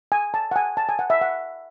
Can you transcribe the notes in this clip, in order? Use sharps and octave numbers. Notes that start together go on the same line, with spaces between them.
G#5
A5
F#5
G#5
A5
G#5
F#5
E5
F#5